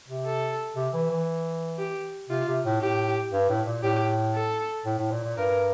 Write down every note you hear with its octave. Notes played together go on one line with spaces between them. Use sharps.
C3
A4
C3
E3
E3
G4
C3 F4
C3
A2
A2 G4
G2
A2
A#2
A2 G4
A4
A2
A2
A#2
A#2
G2 A#4